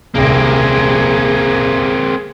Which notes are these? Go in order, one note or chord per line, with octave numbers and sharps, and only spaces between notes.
D#1 C2 A#3 C4 G#4